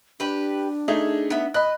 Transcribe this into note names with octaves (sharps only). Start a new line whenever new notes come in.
D4 G4 B4
A3 D#4 G#4
B3 E5
D#5 B5 F#6